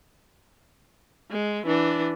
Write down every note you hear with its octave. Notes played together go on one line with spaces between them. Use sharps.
G#3
E3 D4